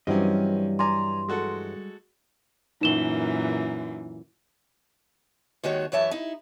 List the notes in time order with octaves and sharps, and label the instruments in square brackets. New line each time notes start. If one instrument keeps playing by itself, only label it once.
[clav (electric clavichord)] G2 E3 F#3 [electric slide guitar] G3 D#5 [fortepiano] C4 C#4
[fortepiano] D5 G#5 A#5 [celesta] C6
[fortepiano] G#3 F#4 A4
[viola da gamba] F#2 A#2 E3 [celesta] D#4 E7 G7
[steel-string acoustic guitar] D#2 D#3 G#3 F#4 C#5
F#2 E3 C#5 E5 A5
D#4 E4